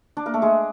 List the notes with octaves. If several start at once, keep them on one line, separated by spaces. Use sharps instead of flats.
D4 D5
A#3 A#4
A3 A4
G#3 G#4